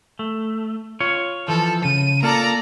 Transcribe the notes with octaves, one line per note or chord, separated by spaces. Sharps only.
A3
F4 C#5
E3 F3 A4
C#3 D#7
A#3 F4 A4 D5 A#5